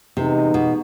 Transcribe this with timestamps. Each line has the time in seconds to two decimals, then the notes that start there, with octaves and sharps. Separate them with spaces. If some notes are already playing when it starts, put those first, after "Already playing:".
0.17 C3 E3 G#3 B3 D#4
0.54 B2